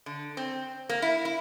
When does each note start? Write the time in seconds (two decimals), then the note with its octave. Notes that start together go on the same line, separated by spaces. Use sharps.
0.06 D3
0.37 C4
0.89 A#3
1.02 E4
1.25 E4